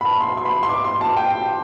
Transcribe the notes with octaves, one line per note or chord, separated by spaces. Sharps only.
B5
A5
C6
C6
B5
C6
D6
C6
A5
G5